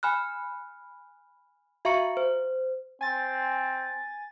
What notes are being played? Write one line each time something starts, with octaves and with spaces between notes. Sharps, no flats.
G#5 B5 F6 F#6
F#4 E5 F5 A#5 C#6 C#7
C5
C4 G#5 A6